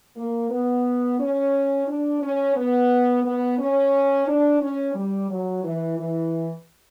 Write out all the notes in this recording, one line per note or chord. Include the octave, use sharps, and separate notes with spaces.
A#3
B3
C#4
D4
C#4
B3
B3
C#4
D4
C#4
G3
F#3
E3
E3